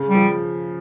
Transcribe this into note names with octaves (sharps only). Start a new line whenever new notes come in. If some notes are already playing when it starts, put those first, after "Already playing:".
Already playing: C#3
G3
F3